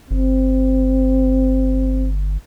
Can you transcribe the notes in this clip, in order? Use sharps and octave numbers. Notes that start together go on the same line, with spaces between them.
G1 C4